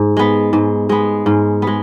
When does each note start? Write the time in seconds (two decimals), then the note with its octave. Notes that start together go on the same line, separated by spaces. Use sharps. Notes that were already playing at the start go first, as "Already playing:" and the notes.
Already playing: G#2
0.17 G#3 B3
0.53 G#2
0.89 G#3 B3
1.26 G#2
1.62 B3
1.67 G#3